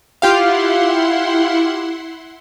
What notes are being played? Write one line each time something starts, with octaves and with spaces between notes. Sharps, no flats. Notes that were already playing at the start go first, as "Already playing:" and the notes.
E4 F4 G4 F5 F#5 C6